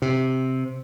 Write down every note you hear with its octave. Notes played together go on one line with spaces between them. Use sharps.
C3